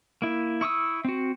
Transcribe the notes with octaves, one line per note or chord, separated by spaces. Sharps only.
A#3 E4
E4 C#6 D#6 E6
C4 F#4